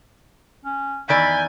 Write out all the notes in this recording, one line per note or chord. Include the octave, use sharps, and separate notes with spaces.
C#4
E2 D#3 D5 G#5 B5 G6